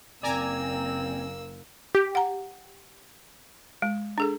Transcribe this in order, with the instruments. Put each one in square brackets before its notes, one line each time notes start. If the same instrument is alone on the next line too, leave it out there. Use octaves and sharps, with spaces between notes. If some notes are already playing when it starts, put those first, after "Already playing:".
[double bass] F#1 [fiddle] A#3 E6 [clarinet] C4 [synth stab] D5 G#5 A#5
[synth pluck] G4
[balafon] F#5 A#5
G#3
D4 G#4 A4